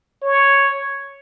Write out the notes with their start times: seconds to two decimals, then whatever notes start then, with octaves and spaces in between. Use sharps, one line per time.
0.22 C#5